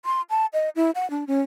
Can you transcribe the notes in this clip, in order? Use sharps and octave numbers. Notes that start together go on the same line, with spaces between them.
C6
A5
D#5
E4
F#5
D4
C#4